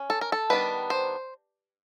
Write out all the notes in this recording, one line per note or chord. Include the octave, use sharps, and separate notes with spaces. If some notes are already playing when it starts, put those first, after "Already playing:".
Already playing: C#4
A4
A#4
A4
D#3 G3 B3 D4 B4
C5